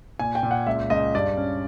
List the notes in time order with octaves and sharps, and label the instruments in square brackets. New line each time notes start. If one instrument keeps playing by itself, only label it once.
[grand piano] A#2 G#5
G5
A#2
F#5
C#2 E5
C#2 D#5
G2 D5
C#4